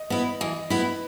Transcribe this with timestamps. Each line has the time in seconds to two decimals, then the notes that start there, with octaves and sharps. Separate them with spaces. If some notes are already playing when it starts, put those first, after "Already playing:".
Already playing: D#5
0.10 B3 E4 D#5
0.41 E3 D#5
0.70 B3 E4 B4